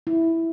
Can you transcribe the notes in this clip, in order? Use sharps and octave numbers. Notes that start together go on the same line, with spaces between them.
E4